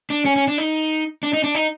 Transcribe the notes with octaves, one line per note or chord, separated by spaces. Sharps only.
D4
C#4
C#4
D4
D#4
D4
D#4
D4
D#4